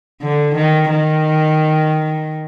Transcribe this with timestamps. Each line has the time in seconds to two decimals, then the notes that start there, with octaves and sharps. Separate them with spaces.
0.22 D3
0.55 D#3
0.89 D#3